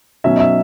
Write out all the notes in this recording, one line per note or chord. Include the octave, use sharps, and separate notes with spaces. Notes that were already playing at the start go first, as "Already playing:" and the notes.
B1 B2 F#3 C#4 E5
D#5
E5